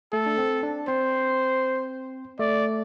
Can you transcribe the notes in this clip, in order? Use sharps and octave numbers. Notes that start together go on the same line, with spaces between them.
A3 A4
D4
C4
D4
C4 C5
A3 D5